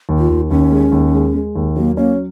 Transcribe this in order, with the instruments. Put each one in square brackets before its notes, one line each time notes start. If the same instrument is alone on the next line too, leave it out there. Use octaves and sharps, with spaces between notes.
[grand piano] D#2
[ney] F4
[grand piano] D#2
[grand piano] D#2 [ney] C#4
[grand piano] G#3
D#2
G#3
G#3
D#2
[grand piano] F#3 [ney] A#3
[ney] A#3 [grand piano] C#4